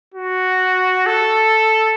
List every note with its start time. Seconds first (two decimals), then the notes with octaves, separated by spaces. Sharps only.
0.14 F#4
1.06 A4